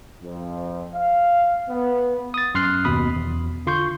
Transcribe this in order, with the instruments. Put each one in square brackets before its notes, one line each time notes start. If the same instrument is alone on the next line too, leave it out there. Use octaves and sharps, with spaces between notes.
[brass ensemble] F2
F5
B3
[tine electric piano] D#6 A6
F#2 C6 F6 F#6 C7
D#2 B2 B5 D#6
E2
D3 F4 C6 C#6 G6